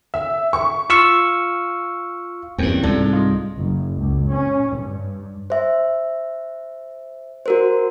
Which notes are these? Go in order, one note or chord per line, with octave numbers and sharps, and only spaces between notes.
E5
C#6
F4 F5 C#6 E6
E2 G2 A#3 C4 C#4
C2 G#2 D4 F4 A4
F4 D#5
F#1
C#2
C#4
G2
C5 E5
F#4 A#4 C5